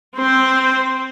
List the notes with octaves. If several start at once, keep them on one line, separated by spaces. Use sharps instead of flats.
C4 C5